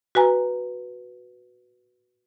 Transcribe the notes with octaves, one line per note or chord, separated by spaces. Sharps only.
F#4 B4 G#5 A#5